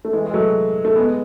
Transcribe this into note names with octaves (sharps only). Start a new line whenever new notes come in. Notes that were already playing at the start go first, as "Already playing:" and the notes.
A3
E3 G#3
G#3
F#3 A3
A3
G#3 B3